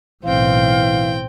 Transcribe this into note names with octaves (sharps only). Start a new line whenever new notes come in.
B1 A2 E3 C4 F5 G5